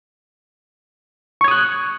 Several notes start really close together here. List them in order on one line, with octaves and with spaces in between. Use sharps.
C#6 G#6 D#6 F#6